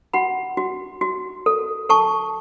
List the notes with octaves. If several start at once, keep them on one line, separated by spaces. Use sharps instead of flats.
F#4 F#5 B5
F#4
F#4
A4
A4 A5 C#6